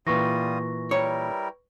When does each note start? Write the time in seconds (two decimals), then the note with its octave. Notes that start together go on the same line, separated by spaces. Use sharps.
0.07 A#2 E3 G3 F4 B4 C#6 D#6 A#6
0.91 G3 E4 A#4 C#5